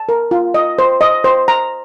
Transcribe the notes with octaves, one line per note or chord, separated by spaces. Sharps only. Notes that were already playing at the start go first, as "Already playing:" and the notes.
Already playing: A5
A#4
F4
D#5
C5
D#5
C5
A#5